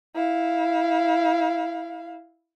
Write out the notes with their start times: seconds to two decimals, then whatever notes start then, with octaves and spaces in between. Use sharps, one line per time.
0.15 E4 F5